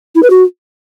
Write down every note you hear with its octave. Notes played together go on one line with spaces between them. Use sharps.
E4
B4
F#4